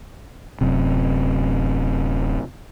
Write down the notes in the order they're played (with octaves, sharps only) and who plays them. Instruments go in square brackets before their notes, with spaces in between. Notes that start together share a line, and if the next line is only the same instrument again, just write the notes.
[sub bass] D1 [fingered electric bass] F#2 C3